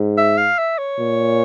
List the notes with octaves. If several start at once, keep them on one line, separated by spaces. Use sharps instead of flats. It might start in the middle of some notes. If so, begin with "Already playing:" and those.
Already playing: G#2
E5
F5
E5
C#5
A#2